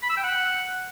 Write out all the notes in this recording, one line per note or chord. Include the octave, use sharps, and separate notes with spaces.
B5
E6
G5
F#5